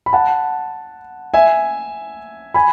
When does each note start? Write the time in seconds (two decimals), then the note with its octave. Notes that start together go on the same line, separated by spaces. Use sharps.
0.06 B5
0.13 F#5 A5
1.34 E5 G#5
2.54 G#5 B5